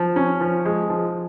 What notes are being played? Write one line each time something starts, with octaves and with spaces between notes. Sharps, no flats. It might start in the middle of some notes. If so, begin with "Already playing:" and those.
Already playing: F3
C#4
F3
G#3
F3